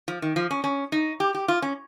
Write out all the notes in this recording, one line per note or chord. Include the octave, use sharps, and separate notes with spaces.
F3
D#3
F3
C#4
C#4
D#4
G4
G4
F4
C#4